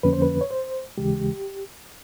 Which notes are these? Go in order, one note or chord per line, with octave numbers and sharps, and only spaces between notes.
F2 D3 F3 A#3 C#4 B4
C5
B4
C#5
C5
D#2 C#3 E3 G#3 G4